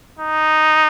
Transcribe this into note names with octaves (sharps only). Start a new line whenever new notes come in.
D#4